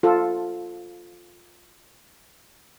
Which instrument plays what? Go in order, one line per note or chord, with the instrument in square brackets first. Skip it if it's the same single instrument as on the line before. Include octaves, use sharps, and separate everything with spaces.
[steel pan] F4 A4